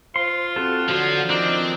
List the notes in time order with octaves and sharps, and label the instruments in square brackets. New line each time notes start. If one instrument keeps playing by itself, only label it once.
[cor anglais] F4 [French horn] C5 [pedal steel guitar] C6
[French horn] C4 [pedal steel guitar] F#4 A4
[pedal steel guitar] D3 F#3 C6 [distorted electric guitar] F3 [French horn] F#4
[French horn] D#3 [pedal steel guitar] F3 A#4 D#5 [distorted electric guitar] C4 [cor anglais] D4